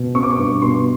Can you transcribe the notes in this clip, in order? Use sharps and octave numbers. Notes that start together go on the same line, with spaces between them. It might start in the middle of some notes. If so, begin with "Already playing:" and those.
Already playing: B2
C4 C#6
D6
C#6
G2
B2 C6